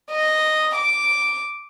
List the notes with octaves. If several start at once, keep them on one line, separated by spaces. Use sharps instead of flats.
D#5
D6